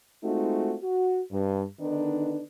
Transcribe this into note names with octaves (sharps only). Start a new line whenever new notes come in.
G#3 A3 C4 D#4 F4 F#4
F#4
G2
D3 D#3 B3 D4 D#4 B4